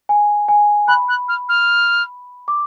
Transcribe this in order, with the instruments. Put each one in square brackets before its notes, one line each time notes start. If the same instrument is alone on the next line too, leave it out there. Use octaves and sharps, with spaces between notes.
[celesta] G#5
G#5
[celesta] B5 [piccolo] F#6
[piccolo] F#6
F6
F6
[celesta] D6